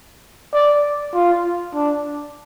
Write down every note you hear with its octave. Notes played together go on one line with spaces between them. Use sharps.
D5
F4
D4